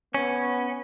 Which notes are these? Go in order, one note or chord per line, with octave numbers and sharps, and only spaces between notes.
B3 C#4